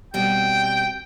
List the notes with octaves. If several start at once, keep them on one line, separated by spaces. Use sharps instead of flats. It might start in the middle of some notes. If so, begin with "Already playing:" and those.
B2 G3 C4 G5